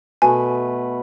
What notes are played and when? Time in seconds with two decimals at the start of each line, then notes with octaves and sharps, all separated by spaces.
0.22 B2 A3 B4 G#5